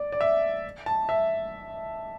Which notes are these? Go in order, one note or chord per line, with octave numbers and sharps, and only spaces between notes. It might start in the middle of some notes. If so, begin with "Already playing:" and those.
Already playing: D5
D5
E5
A5
E5